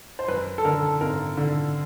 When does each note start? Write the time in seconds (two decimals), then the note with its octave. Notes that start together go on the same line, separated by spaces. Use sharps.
0.19 C5
0.28 F#2 B4
0.58 A4
0.65 D3 A#4
0.83 A4
1.01 G#1 A#4
1.37 D3